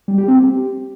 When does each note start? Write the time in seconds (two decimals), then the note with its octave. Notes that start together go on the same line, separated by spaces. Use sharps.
0.08 G3
0.18 G4
0.28 C4
0.38 G4